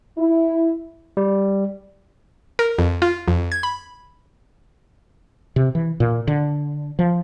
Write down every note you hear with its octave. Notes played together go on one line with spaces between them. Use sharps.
E4
G3
A#4
F2
F4
F2
G#6
B5
C3
E3
A#2
D3
F3